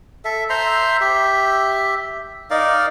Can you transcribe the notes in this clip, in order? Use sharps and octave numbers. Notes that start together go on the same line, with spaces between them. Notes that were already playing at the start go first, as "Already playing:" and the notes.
A4 E5
C5 E5 A#5 C6
G4 E5
D#4 A#4 D5 F5